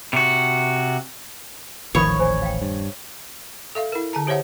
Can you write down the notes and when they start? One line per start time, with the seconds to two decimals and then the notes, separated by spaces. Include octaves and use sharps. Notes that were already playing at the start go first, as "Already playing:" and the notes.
0.13 C3 F#4
1.95 D#1 A1 D#3 F3 C#5 F5 B5 D#6
2.19 C5 G#5
2.42 F5 G5
2.62 G2
3.75 A4 E5 F5
3.92 E4 A#4
4.13 D3 A5 A#5
4.27 G4 C5 C#5 E5 F#5